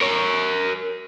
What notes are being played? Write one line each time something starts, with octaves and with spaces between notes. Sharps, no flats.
A#4 C#5